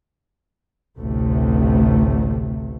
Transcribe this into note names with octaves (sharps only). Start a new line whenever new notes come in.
A1 D2 C3 A3